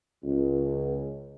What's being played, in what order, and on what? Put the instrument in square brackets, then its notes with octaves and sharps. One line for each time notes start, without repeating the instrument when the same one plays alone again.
[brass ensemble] C#2